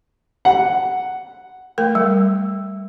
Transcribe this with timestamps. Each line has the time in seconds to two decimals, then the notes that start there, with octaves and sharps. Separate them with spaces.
0.45 F#5
1.78 A3 A#4 G5
1.95 G3